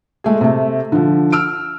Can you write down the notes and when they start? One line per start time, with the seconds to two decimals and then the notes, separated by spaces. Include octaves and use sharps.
0.24 G#3 A3 G#4
0.41 C3 A3
0.92 D3 F3
1.32 E6 F6 D7